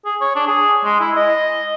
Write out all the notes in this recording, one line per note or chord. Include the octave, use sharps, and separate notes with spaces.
G#4
C#5
D4
G#4
G#3
E4
D#5